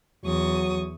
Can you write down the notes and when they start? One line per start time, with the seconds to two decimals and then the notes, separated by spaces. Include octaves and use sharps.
0.25 E2 F#3 C#6 D#6